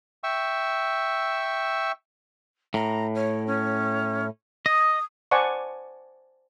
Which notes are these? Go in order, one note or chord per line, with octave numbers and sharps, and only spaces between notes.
E5 G5 C#6 E6
A2 A#5
C#5
C#4
D#5 D#6
C5 D5 F#5 G#5 A5 C#6